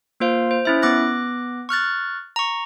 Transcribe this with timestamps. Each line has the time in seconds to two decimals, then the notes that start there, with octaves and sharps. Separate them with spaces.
0.20 A#3 F4 C5 F5
0.51 C5
0.65 C#4 E4 E5
0.82 B3 D6 F#6 A#6
1.69 C#6 F6 F#6 A6
2.36 A#5 C#6